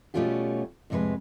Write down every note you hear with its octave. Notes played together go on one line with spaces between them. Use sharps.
B2 G3 A3 C#4 F4 G4
F2 A2 C3 F#3 G#3 B4